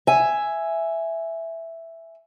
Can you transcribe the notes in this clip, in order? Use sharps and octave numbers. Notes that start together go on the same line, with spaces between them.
E5 G#5